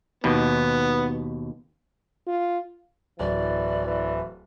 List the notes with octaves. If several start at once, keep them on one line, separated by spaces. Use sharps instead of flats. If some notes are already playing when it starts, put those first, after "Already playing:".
D#2 B2 B3
F4
D1 E3 D5
E3